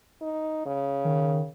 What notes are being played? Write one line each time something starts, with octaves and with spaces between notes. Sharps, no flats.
D#4
C#3
D#3